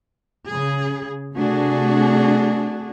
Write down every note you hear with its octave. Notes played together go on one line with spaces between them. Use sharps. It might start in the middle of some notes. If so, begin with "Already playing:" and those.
C#3 G#4
C3 A3 D4 F#4 G#4